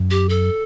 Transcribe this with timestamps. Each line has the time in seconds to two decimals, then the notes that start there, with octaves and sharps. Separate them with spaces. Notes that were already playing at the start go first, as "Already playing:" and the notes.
Already playing: F#2
0.11 G4
0.29 A4